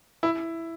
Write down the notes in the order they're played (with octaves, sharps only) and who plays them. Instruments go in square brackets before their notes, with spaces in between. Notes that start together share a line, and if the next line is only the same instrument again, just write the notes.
[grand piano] E4